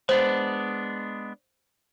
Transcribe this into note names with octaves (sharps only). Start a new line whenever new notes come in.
G#3 B3 D4 C5